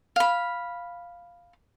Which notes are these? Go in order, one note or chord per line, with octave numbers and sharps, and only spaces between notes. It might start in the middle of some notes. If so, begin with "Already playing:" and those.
F5 B5